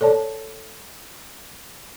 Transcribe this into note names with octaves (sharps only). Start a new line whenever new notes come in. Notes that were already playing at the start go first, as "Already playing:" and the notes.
A4 C#5 D5 A5